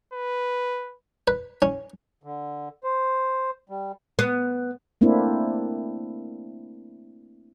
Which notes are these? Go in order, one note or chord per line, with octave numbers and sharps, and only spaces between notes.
B4
B4
C#4
D3
C5
G3
B3
A3 A#3 C4 D4 E4